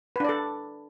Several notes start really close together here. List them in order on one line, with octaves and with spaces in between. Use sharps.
B4 D4 D5 A4